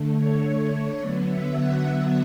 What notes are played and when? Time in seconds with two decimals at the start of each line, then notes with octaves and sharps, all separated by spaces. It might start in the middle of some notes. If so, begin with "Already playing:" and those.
Already playing: D3 A3
0.16 C#5
0.44 C#5
0.72 C#5
1.00 D3 F#3 B3 D5
1.28 E5
1.57 F#5
1.84 F#5